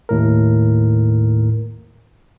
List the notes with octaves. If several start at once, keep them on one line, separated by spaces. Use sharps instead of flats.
D#2 A2 A#4